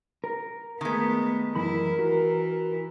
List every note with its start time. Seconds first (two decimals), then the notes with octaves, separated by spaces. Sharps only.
0.24 A#4
0.81 D#3 G#3 A3 B3
1.55 F#2 E3 E4 A#4 B5
1.99 E3 F#4